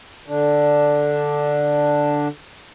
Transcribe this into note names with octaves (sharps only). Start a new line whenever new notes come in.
D3 D4